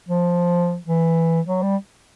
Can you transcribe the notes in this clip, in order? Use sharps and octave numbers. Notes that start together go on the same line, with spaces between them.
F3
E3
F#3
G3